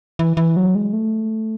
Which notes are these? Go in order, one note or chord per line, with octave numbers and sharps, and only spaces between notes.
E3
E3
F#3
G#3
A3